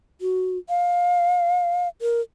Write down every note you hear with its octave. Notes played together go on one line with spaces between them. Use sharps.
F#4
F5
A#4